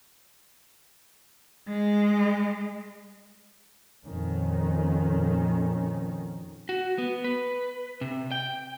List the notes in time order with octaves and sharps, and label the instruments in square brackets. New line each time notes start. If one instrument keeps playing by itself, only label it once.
[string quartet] G#3
[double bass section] F2 A#2 D#3 C#4
[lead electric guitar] F#4
B3
B4
C3
G5